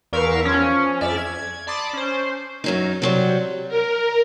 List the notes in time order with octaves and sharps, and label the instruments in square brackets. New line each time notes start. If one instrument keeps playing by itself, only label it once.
[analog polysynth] E2 A#4 F5 C#6 E6 B6
F3 C#4
F2 D5 E5 F6 E7
G#6
D5 A5 B5 C6 D6 D#6
C#4 C5
[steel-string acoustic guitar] F#2 F#3 D#4
C3 F#3 G3
[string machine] A#4